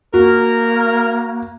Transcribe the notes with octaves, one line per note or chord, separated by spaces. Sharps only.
A#3 F#4 A#4